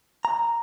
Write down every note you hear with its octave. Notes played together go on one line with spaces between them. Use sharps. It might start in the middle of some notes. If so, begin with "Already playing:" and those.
A#5